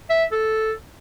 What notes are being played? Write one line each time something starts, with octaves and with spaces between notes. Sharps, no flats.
E5
A4